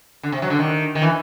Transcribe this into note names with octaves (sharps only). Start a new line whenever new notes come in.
D3
C3
F#3
D3
D#3
D#3
E3